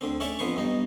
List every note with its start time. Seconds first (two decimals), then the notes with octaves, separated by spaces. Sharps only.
0.01 D2 D3 C4
0.20 A3 C#4 A4 C#5 D5 E5
0.39 F2 D3 B3 B4 C5 C#6
0.56 B1 G2 B2 D#4